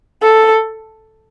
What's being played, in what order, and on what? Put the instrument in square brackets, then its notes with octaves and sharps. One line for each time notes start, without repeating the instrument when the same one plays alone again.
[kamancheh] A4